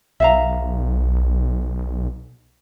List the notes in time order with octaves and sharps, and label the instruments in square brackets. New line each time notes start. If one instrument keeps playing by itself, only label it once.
[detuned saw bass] B1 [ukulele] E5 F5 A#5